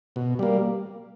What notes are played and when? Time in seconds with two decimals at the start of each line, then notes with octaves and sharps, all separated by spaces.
0.16 B2
0.39 G3 A#3